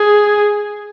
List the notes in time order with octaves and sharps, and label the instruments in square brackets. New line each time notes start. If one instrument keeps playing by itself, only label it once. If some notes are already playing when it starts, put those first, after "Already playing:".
Already playing: [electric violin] G#4